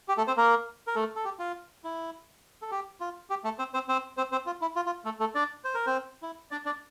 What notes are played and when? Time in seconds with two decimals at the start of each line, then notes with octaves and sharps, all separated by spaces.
0.08 G4
0.18 A3 A4
0.27 C4 C5
0.37 A#3 A#4
0.87 A#4
0.95 A3 A4
1.16 A4
1.25 G4
1.39 F4
1.84 E4
2.62 A4
2.71 G4
3.00 F4
3.30 G4
3.44 A3 A4
3.59 C4 C5
3.74 C4 C5
3.89 C4 C5
4.17 C4 C5
4.32 C4 C5
4.46 F4
4.61 E4
4.76 F4
4.86 F4
5.05 A3 A4
5.20 A3 A4
5.35 D4 D5
5.64 C5
5.75 A#4
5.86 C4 C5
6.23 E4
6.51 D4 D5
6.65 D4 D5